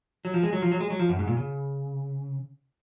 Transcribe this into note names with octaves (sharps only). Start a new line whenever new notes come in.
F#3
F3
G#3
F#3
F3
F#3
G#3
F#3
F3
F#2
G#2
A#2
C#3